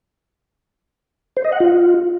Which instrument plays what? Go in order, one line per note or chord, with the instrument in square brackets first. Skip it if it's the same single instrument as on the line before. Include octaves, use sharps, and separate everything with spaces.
[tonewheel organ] C5
D#5
F#5
F4